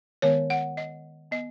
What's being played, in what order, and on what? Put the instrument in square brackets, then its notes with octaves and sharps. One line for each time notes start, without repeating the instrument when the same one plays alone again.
[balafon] D#3 G#3 B3 C#5
F#5
D#5
B3 D#5